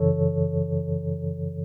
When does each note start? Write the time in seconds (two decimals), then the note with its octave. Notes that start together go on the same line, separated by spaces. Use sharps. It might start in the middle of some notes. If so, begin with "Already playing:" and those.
Already playing: F#2 C#3 E3 A4 C#5